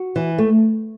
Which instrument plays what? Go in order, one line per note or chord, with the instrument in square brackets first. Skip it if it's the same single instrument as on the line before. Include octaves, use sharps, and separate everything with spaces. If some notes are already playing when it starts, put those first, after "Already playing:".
Already playing: [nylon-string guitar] F#4
E3
A3